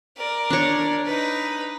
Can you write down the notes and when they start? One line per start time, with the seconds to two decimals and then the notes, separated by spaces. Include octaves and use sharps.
0.17 A#4 D5
0.50 D4 C#5
1.05 D#4 B4